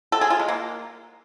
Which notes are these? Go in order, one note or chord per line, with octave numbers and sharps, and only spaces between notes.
A4
G#4
F4
G#3
A#3